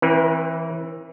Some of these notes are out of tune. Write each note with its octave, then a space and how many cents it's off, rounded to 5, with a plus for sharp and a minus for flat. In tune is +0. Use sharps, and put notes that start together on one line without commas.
E3 +0 C4 +45 B4 -45